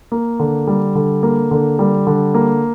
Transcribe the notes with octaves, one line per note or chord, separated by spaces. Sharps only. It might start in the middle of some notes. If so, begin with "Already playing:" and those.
A#3
D3
G3
D3
A#3
D3
G3
D3
A#3